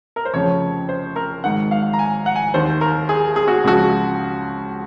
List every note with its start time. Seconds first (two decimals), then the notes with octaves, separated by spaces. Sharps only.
0.16 A#4
0.25 C5
0.34 F1 F2 C#3 F3 C#5
0.89 C5
1.16 A#4
1.44 G#1 G#2 D#3 F#5
1.71 F5
1.93 A#5
1.99 G#5
2.26 F#5
2.36 G#5
2.54 D#2 D#3 C5
2.81 A#4
3.09 G#4
3.36 G#4
3.48 F#4
3.64 C#2 C#3 F3 F#4